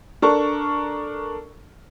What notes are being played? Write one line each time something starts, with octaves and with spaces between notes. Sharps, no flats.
D4 A4 A#4 C#6